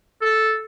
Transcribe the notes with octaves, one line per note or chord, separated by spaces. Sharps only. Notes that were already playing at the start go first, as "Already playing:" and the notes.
A4